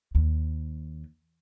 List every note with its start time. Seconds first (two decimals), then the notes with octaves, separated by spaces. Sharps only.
0.15 D#2